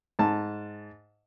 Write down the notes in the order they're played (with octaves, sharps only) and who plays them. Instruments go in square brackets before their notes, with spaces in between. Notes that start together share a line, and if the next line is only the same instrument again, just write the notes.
[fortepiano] G#2 A5